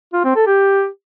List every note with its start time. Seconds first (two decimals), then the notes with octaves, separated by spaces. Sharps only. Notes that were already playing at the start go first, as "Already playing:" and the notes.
0.13 F4
0.25 C4
0.36 A4
0.47 G4